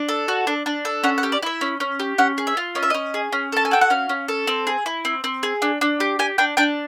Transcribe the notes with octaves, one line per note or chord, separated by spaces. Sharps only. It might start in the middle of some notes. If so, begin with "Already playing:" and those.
Already playing: D4
A4
F#4
D4
D4
A4
C#4 F#5
F#5
G4
D5
E4 E5
C#4
C#4
G4
C#4 F#5
G#4
E5
F4
C#4 D#5
E5
C#4 D#5
G#4
C#4
A4 A5
G#5
F#4 G5
F#5
C#4 F5
C#4
A4
C4
G#4
E4
C4
C4
G#4
D4
D4
G4
G4 G#5
D4 G5
D4 G5